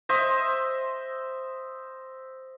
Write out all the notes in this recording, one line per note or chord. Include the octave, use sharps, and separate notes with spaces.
C5 D#5 E5